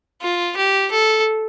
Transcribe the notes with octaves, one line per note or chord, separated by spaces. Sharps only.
F4
G4
A4